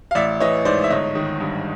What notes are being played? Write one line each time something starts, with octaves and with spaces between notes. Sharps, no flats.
F5
A1 D5 E5
E3 C#5 D#5
G#2 C5 D5
E5
G1 C#5 D#5
D#3
G2